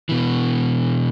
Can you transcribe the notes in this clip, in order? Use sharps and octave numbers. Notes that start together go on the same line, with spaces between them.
B2 E3